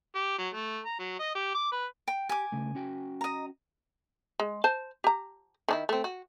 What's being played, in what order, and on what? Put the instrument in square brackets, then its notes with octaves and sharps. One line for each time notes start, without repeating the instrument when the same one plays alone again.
[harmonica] G4
F#3
A3
A#5
F#3
D#5
G4
D6
B4
[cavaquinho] G5
[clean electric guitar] G4 [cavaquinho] G#5 D6
[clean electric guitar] C#2 C#3 A3
C#4 F#4 G5
[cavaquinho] D#5 A#5
[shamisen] G#3
C5 A5
G4 A#5
D#3 D4 E4
A3 C4
F#4